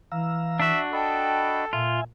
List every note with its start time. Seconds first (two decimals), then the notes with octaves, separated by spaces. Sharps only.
0.12 E3 F5 A#5 E6
0.60 D4 F#4 E5
0.93 A4 D#5 G5 B5
1.73 A#2 F4 E5 G#5